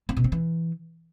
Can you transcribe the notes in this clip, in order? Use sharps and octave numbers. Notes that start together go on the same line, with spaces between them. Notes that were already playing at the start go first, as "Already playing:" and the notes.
C4
B2
C4
E3